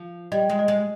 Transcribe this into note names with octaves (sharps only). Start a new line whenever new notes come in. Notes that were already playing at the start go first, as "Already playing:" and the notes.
Already playing: F3
G3 D#5
G#3
D#5
G#3